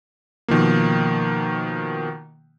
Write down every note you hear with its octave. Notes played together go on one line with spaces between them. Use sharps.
B2 D#3 F3 A#3